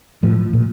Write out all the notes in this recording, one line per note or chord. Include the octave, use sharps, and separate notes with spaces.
A2 F3
A#2